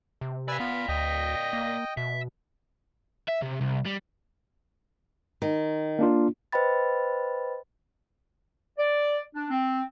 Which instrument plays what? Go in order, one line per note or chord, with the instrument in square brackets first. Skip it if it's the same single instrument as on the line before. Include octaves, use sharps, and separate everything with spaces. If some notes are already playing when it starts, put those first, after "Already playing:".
[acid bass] C3
[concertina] B4 G#5 E6 [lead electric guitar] D5 F5
[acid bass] B3 [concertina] F4 B5
[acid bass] D2 [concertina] D#5 G5
[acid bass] A#3
[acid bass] B2 [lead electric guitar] E5
[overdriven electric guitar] E5
C3
C2
G3
[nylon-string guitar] D#3
[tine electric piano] A#3 D4 F4
[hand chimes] B4 C5 D#5 G5 B5 A6
[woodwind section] D5
D4
C4